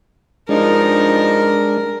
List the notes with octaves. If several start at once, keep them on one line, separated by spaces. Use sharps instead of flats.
G2 F3 G#3 D4 D#4 A#4